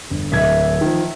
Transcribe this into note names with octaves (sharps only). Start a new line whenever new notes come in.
G1
D1 E5 G#6
D#3 F3